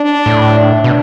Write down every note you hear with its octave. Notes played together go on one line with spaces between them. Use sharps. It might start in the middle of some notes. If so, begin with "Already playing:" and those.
Already playing: D4
A2
D4
B2